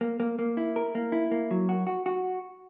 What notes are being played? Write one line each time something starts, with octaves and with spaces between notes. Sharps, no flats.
A#3
A#3
A#3
E4
A#4
A#3
E4
A#3
F#3
F#4
F#4
F#4